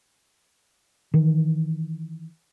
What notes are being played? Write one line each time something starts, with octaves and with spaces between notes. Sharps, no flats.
D#3 E3